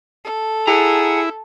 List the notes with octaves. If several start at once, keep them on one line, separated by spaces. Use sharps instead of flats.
A4
E4 G#4 F#5 A#5